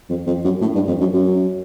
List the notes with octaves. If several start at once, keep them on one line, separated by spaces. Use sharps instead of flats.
F2
F2
F#2
A2
G2
F2
F#2
F#2